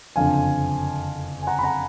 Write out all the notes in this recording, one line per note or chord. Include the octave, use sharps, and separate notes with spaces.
F#1 F2 D3 F3 F5 G#5
G#5
F#5 A#5
B5
F#5 A#5